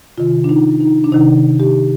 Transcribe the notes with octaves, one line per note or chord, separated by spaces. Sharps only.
C3 D#3 F4
D4
D#4
D#4
D4
C3 D#3 D#4
G4